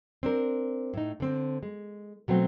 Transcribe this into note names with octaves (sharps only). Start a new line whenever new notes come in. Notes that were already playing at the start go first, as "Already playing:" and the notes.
C4 D4 A#4
A2 D#4
D3 C4
G#3
B2 F#3 A3 C4